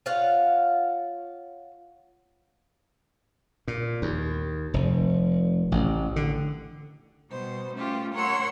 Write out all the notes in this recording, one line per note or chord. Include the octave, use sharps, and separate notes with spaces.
F4 C#5 F5 F#5
A#2
D#2
F1
A1
D3
B2 G3 C5
A3 C#4 F4 G4
A#4 C#5 F#5 C6 E6